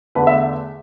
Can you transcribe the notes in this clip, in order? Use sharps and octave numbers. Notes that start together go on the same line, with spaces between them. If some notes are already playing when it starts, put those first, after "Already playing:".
E2 D3 A3 B4
E5